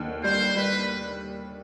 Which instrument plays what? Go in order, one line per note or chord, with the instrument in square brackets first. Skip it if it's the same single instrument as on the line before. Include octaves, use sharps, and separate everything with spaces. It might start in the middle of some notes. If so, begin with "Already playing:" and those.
Already playing: [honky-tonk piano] D#2 D3
[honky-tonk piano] G3 [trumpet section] C5
[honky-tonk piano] G3 [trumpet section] B4